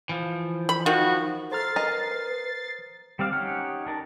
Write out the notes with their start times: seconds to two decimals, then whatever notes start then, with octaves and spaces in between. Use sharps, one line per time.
0.09 E3 F3
0.69 B5
0.86 D#3 F3 F#4
1.52 A4 C5 A#5 F6 A6 C7
1.76 A#4 B4 D#5
3.19 G3 C4 D5 F5
3.33 C#4 D#4 G4 C#5 F#5
3.87 D4 A#4 A5